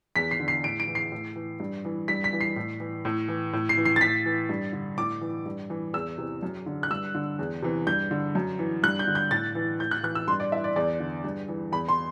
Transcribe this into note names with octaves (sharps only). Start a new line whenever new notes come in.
E2 B6
C7
D3
C7
A2 D7
D7
E3
C7
A2
E3
G2
E3
G2 B6
B6
E3
C7
A2
E3
A2
E3
A2
C7
E3
C7
A6
A2 B6
E3
G2
D3
A2 D6
E3
G2
E3
E2 E6
C3 E3
F#2
D3
F#6
G2 E6
D3
E2
C3 E3
G2 G6
D3
F#2
E3
G2 F#6
G6
D3
G6
A2 A6
E3
A2 G6
F#6
E3 F#6
E6
G2 C6
D5
E3 E5
D5
E2 D5
D3
G2
E3
E2 B5
C6